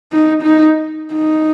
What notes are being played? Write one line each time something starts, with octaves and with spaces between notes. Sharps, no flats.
D#4
D#4
D#4